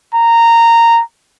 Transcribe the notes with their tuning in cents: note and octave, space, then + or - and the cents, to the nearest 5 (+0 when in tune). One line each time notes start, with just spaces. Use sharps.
A#5 -15